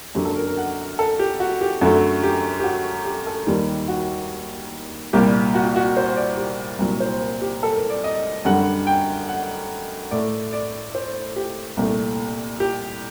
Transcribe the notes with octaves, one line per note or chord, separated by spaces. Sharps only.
F#2 D3 F#3 A#3 G4
A4
A#4
A#4
F#5
A4
G4
F#4
G4
F#2 D3 F#3 A3 F#4
G4
G4
F#4
G4
A4
D#2 D#3 G3 A#3 G4
F#4
C2 A#2 G3 A#3 G4
F#4
F#4
F#4
C5
D5
G4
C2 A#2 F#3 A#4
C5
A#4
G4
A4
A#4
D5
D#5
F#2 D3 G3 F#5
G5
F#5
A2 A3 D5
D5
C5
G4
C2 A#2 A3
G4